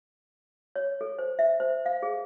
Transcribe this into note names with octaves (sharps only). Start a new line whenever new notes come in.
C#5
A4
C5
E5
C5
F5
G#4